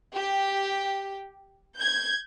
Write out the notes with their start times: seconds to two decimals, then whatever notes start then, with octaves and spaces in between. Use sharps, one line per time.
0.17 G4
1.78 G6 G#6